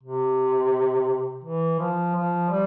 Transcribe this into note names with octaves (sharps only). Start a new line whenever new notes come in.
C3
E3
F3
F3
G3